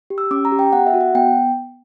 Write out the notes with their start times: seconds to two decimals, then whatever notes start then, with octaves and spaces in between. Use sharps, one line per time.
0.10 G4
0.18 E6
0.31 C#4 D6
0.45 A#5
0.52 G4
0.59 G5
0.73 B3 F#5
0.87 E5
0.93 F#4
1.01 F#5
1.15 B3 G5